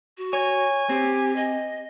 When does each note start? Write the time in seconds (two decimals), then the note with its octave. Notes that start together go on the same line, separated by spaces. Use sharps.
0.17 F#4
0.33 C#5 G#5
0.90 C4 G4
1.36 D#5